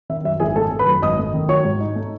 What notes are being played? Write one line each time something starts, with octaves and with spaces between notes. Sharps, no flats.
D#3 E5
F#2 E5
G#1 G#4 G#5
A3 A4 A5
D#3
B4 B5
F#2
G#1 D#5 D#6
A3
D#3
F#3 C#5 C#6
G#2
D#4
A3